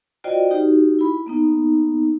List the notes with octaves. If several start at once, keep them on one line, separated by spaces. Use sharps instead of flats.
F4 F#4 C5 D5 D#5 G5
D#4 F#4 G4
E4 B5
A#3 B3 D#4